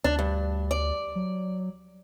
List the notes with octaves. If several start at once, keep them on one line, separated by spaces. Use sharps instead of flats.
D2 D4
G2
D5
F#3